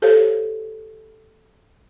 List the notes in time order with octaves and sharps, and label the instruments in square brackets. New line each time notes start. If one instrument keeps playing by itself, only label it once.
[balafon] G4 A4 C5 C#5 F5